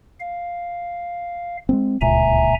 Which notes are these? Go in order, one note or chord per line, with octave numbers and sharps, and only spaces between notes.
F5
G#3 B3 C4
D1 C#2 A#2 E5 G#5 A#5